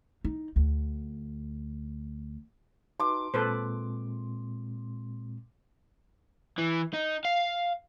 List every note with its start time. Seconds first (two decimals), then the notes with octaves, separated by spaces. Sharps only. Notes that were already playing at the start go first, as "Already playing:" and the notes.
0.25 D#4
0.56 D2
3.00 D#4 F#4 B4 C6 D6
3.34 A#2 G#3 C4 A4 B4 C5
6.58 E3
6.94 D#4
7.25 F5